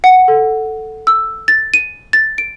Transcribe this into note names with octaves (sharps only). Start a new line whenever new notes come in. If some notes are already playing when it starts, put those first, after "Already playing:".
F#5
A4
E6
A6
D#7
A6
D7